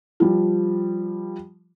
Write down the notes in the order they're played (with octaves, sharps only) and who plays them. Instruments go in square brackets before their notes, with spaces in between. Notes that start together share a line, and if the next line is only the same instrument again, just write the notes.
[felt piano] F3 G3